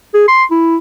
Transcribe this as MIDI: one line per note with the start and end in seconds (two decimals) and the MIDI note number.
0.14 0.25 68
0.28 0.44 84
0.51 0.77 64